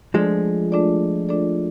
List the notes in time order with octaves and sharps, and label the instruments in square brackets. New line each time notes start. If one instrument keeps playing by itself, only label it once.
[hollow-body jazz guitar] F3 G#3 [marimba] A3 D4 F4 A4 D5
[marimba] A3 D4 F4 A4 D5
A3 D4 F4 A4 D5